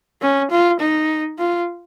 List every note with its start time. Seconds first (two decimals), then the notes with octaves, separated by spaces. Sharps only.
0.22 C#4
0.51 F4
0.80 D#4
1.38 F4